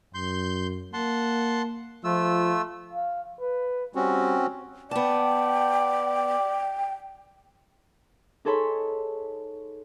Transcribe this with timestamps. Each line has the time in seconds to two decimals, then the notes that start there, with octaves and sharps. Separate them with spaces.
0.14 F#2 C6 G6
0.93 A#3 F#5 A5 C6
2.04 F3 A3 F4 E6
2.93 F5
3.40 B4
3.95 G3 C4 C#4 F#4
4.91 B3 D5 G5 A5
8.45 D#4 G#4 A4 C#5 B5 C6